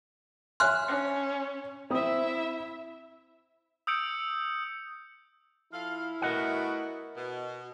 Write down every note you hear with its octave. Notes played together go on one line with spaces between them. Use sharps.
C#5 E5 G#5 C6 F6 F#6
C#4
C4 E4 E5 D#6
D#6 E6 G6 C#7 D7
F3 E4 A4 F5
A3 B3 F#4 A#4 D#5 F#5
B2